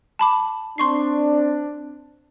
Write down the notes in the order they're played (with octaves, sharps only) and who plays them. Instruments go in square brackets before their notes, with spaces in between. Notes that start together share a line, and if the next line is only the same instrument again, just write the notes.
[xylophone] A5 B5 D6
[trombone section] C4 D4 [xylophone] C6 C#6 C7